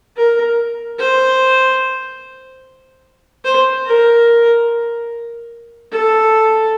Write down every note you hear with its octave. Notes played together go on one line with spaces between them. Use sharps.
A#4
C5
C5
A#4
A4